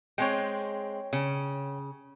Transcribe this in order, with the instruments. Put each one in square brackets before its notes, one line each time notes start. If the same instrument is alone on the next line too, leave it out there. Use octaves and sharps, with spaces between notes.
[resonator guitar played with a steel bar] G#3 C4 [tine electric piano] C#5 G5
[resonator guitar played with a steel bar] C#3